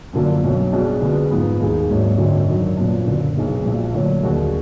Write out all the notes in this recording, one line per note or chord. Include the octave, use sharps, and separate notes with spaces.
F#2 D3 F3 A#3 D4
B1 B2 F#3
B1 B2 G#3 D4
F2 D3 G#3 B3
G#2 F3 B3 D#4
D#2 D#3 G#3 D#4 G#4
G#1 G#2 F#3 A#3 D4
G#1 F#2 D3 F#3
F#2 D#3 F#3 D4
A#1 A#2 F#3 B3 D4
F#1 F#2 D3
B1 B2 G#3 B3 D#4
A#1 A#2 F3
D2 D3 F#3 A#3
D#2 D3 G#3 D4 F#4